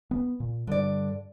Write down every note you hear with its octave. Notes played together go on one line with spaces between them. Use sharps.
B3
A#2
G2 D3 D5